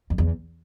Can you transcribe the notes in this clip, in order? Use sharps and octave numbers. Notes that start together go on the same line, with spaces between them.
F2
E2